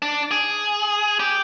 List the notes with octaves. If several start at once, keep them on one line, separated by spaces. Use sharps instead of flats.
D4
G#4
G4